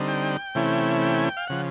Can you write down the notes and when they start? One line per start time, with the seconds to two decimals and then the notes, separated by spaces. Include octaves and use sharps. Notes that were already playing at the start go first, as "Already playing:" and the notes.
Already playing: D3 G3 C4 D#4
0.08 G5
0.55 C3 E3 A3 C#4 E4
1.02 G5
1.18 G#5
1.24 G5
1.37 F5
1.47 C#3 F3 F#5